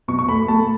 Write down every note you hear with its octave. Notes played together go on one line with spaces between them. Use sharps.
B2 C#6
C#6
A3 B5
A3 A5